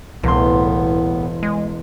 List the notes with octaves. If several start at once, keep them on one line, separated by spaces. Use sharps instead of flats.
E1 C2 A2 B3 C6
G#3